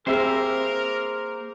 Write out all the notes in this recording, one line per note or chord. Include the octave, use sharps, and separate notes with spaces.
A#3 C4 G4 G#4 A#4 C5 E5